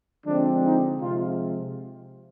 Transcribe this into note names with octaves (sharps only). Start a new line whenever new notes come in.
D3 F3 G#3 C4 D4
D#4
C3 F3 G#3 F4